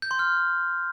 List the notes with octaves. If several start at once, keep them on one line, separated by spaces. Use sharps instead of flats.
G6
C6
F6